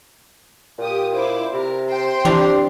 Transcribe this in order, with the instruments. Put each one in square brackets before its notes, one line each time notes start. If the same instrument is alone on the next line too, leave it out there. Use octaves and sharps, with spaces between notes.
[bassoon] A#2 [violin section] G4 D#6
[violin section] E4 C5 D6
[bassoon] C3 [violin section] A#4
[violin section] C5 G5 C6
[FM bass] E3 [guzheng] C4 D4 A#5 [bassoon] G4